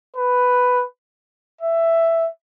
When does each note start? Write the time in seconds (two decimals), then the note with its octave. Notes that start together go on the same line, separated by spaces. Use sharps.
0.16 B4
1.61 E5